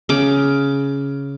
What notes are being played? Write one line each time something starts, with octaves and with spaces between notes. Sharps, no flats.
C#3 D6